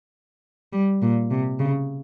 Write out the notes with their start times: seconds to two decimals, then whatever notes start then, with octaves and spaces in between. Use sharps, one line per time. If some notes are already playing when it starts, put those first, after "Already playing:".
0.73 G3
1.02 A#2
1.31 C3
1.59 C#3